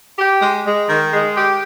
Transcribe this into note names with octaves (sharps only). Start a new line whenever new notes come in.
G4
G#3
G#3
D#3
G#3
G4